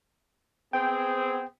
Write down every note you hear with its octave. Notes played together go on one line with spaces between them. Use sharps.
B3 C4 G#4 G5